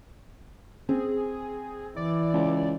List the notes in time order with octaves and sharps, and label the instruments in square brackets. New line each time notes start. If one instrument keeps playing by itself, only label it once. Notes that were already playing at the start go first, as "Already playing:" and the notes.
[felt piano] C4 [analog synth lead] G#4
[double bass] E3 [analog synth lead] D5
[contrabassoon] C#2